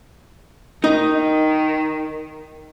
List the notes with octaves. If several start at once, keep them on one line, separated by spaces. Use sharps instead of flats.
D#3 D#4 D#5